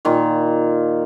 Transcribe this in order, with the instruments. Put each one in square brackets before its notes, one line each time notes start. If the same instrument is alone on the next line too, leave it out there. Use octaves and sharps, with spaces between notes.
[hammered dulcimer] A#2 D#3 F4